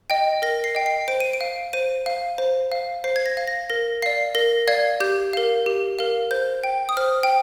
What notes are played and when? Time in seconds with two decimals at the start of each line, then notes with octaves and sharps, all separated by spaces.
0.10 D#5 G5
0.42 A#4 A#6
0.64 C7
0.75 D#5 G5
0.86 C7
1.08 C5 D7
1.20 D#7
1.33 D7
1.41 F5
1.73 C5 D#7
2.06 F5
2.38 C5
2.72 F5
3.04 C5 C7
3.16 G#6
3.26 A#6
3.37 F5
3.47 A#6
3.70 A#4 A#6
4.02 D5 F5 C7
4.35 A#4 A#6
4.67 D5 F5 G#6
5.00 G4 G6
5.33 A#4 F5
5.66 G4
5.99 A#4 F5
6.31 C5 G6
6.64 G5
6.89 D#6
6.97 C5 F6
7.23 G5